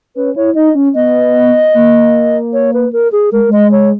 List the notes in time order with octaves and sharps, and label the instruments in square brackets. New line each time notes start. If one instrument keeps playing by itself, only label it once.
[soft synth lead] C#4 [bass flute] B4
[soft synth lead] E4 [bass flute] C#5
[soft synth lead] D#4 [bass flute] D#5
[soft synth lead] C#4
[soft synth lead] B3 [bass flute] D#5
[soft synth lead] A#3
[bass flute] C#5
B4
A#4
G#4
[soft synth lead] G#3 [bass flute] A#4
[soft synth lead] G#3 [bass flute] D#5
[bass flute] C#5